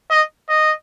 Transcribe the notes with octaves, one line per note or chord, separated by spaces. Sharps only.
D#5
D#5